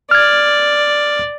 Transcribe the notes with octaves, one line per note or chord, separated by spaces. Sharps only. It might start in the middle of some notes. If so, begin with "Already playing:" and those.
D5 F6 G#6